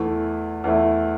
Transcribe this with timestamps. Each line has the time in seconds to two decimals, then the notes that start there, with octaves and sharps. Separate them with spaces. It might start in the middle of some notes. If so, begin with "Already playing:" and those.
Already playing: E2 E3 A3 E4
0.64 E2 E3 A3 E4